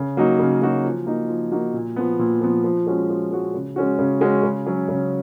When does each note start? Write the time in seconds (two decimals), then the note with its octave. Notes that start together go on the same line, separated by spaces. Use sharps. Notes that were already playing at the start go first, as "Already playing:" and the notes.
Already playing: C#3
0.17 F#3 A#3 D#4 F#4
0.39 C#3
0.62 F#3 A#3 D#4 F#4
0.85 F3
1.06 A#3 D#4 F#4
1.29 F3
1.52 A#3 D#4 F#4
1.74 A#2
1.96 F3 B3
2.19 A#2
2.41 F3 B3
2.64 F3
2.86 G#3 C#4 F#4
3.09 F3
3.32 G#3 C#4 F#4
3.54 C#3
3.76 G#3 C#4 F#4
3.99 C#3
4.21 G#3 C#4 F#4
4.43 C#3
4.66 F#3 C#4
4.88 C#3